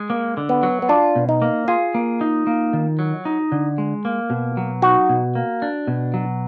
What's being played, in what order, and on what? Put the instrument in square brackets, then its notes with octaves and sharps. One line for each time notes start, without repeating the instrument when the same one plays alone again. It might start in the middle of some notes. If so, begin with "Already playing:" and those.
Already playing: [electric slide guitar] G#3
A#3
D3
[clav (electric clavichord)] B3
[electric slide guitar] F#3
[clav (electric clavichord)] B3
[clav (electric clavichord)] D4 [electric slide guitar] F4
[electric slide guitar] B2
[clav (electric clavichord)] D#4
[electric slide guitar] A#3
[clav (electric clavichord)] F4 [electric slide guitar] G#4
[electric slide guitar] A#3
D#4
A#3
D#3
F#3
D#4
D3
G#3
A#3
B2
F#3
[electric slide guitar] D#4 [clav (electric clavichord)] F#4
[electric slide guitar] B2
A#3
D4
B2
F#3